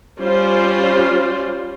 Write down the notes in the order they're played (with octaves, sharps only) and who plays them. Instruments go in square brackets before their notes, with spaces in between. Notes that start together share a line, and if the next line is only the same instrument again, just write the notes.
[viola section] G3 C#4 F4 C5 D5